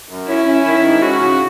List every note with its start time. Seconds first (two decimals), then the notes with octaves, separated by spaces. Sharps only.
0.08 F#2
0.27 C#4 E4
0.46 C#4
0.65 D#3 E4
0.83 G#2
1.02 C#4 F#4
1.21 C#3